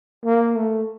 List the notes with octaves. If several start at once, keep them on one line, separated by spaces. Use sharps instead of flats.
A#3
A3